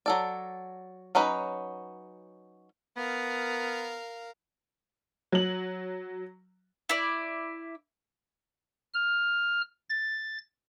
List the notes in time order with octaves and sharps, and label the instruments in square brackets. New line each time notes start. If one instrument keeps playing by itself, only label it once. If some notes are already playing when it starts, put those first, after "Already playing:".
[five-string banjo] F#3 A4 D5
F#3 C#4 D#4 B4
[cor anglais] B3 [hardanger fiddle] A#4 F5
[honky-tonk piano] F#3 F#7
[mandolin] E4 D5
[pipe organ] F6
A6